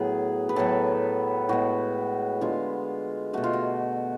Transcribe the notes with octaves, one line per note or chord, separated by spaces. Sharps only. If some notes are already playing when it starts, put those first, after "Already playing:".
Already playing: A2 F#3 B3 G#4
B4
A2 F#3 B3 A4
A2 G#3 B3 F#4
D3 G#3 B3 F4
B2 A3 F#4
F4
F#4